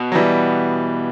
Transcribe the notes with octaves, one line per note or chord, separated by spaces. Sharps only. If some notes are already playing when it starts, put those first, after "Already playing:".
Already playing: B2
F#3
E3 G3